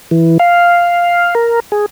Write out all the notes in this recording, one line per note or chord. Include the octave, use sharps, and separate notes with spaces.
E3
F5
A#4
G#4